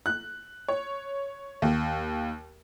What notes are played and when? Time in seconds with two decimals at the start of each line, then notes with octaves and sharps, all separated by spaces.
0.06 F#6
0.68 C#5
1.62 D#2